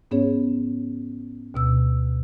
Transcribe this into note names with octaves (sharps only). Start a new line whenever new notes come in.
G#2 B3 C#4 G#4 C#5
D2 B2 E6